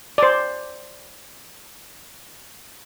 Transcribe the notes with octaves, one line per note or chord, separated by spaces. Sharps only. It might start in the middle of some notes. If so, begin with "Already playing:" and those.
C5 D5